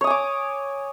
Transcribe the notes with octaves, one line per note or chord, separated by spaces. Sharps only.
C#5 G#5 D6 D#6